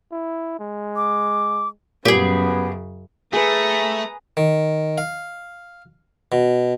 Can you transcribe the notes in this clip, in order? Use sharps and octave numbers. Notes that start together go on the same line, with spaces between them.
E4
G#3
D6
F#2 A#2 C#3 G3 B3 G4 G#4
A3 G#4 B4 A#5 D#6
D#3
F5
B2